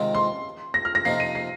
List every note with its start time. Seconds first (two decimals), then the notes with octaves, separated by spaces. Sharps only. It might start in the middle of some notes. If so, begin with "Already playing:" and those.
Already playing: C3 D#3 G#3 C4 F4
0.14 C6
0.74 A#6
0.85 F6
0.95 A#6
1.05 F2 C3 F3 A#3 D#4 C7
1.20 D#7
1.35 C7